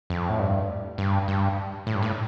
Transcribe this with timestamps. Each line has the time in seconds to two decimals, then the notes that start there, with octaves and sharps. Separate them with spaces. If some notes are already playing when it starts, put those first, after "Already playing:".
0.10 F2
0.30 A2
0.39 G2
0.98 G2
1.28 G2
1.87 A2
1.95 G2
2.03 A2